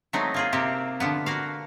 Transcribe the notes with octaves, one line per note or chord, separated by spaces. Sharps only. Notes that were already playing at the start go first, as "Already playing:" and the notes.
F#3 G#3 A3 B3 C4 D#4
A#3 F4 G#4
C3 A#3 C4 G4
D3 F3 B3
A#3 F#4 F5